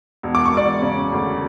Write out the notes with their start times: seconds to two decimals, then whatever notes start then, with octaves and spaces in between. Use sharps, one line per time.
0.23 E1
0.35 D6
0.46 C#6
0.53 E1 D5 D6
0.82 C#3
1.12 D2